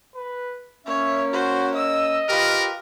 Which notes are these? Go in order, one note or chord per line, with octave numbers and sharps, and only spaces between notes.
B4
A#3 C#4 C#5 E5
F#4 C5
D#5 E6
F4 G4 A#4 B4